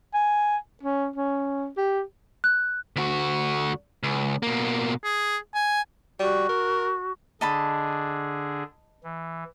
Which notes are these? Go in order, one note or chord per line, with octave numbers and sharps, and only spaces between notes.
G#5
C#4
C#4
G4
F#6
D2 F#4
C#2
B2 A#3
G#4
G#5
G3 F#4
A#4
D3 D4 G#4 D#5 A5 B5
E3